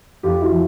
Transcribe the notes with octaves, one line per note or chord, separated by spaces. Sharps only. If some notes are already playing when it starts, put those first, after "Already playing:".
F2 F4 G4
E4 F#4
F3